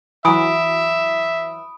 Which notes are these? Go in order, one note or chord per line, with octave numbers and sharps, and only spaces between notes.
E3 F#3 E5 B5 D#6 D7